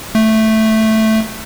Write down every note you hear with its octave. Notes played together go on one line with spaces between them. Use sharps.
A3